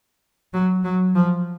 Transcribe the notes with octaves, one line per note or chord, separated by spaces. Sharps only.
F#3
F#3
F3